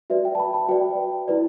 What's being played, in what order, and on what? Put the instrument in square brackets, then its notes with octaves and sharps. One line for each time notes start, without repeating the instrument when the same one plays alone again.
[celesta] F#4 B4 D5 E5
G5
A5
B5
A5
F#4 B4 D5 G5
E4 B4 D5